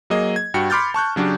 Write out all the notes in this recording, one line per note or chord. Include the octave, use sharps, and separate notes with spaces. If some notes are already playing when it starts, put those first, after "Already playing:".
F#3 A#3 G#4 D#5
G#6
G2 F#4 G5 C#7
B5 C6 D6 F6 G6 A6
A5 C#6 F#6 G6
C#3 F#3 D4 F#4 G4